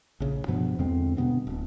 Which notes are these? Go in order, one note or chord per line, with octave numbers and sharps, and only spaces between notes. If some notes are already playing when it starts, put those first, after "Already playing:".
A#1 C#3
G2 B2 F3 B3
E2 D3 G#3 C4
G2 B2 B3 C4
D1